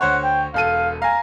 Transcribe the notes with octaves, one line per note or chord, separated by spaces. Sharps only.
D2 C5 C#5 F#5
G5
E1 A4 F5 D#7
F5 G#5 A#5